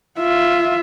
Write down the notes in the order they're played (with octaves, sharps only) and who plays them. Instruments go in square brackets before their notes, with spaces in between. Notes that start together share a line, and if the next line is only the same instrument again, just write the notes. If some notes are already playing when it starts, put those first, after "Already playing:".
[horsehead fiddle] F4 E5